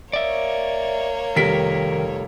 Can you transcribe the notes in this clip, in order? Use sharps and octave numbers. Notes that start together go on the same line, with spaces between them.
A#3 C#5 D5 E5
F1 D#3 G3 A#4 B6